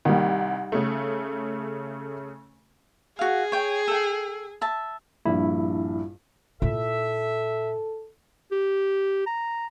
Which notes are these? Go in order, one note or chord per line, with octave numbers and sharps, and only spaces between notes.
C2 D#3 G3
C#3 A3
F#4 G#4 F5
C#5 G5
A4 G5
E5 A5
A#1 G2 E4
A#2 E4 A4 E5
G4
A#5